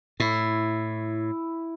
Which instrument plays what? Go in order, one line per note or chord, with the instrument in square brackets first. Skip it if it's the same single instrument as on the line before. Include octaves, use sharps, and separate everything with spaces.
[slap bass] A2 [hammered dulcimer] E4 C#6